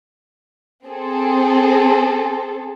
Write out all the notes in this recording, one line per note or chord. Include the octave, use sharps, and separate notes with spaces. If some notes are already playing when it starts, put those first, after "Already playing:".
C4 G#4 A4